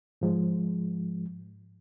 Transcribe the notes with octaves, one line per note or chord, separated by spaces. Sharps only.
G#2 F3 G#3